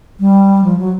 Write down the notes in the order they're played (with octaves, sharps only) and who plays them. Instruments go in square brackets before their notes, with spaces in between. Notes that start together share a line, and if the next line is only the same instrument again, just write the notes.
[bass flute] G3
F3
F#3